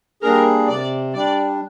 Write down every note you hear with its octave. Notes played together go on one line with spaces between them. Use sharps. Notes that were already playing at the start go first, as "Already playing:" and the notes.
G3 A#3 D4 G#4 A#4
C3 D5
G3 D4 D5